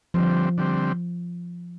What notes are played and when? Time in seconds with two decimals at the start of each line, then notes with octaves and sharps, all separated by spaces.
0.14 D3 F3 G3 C4
0.58 D3 G3 C4